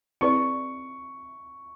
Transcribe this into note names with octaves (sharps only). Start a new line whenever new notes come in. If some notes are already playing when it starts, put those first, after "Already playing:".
C4 E4 G#4 B4 D5 C#6